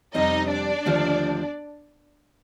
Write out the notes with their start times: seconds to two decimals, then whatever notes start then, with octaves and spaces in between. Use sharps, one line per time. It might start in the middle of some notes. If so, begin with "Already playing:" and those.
0.14 F2 C3 G3 C4 D#4 D#5
0.49 D4 D5
0.86 D#2 D3 F3 A3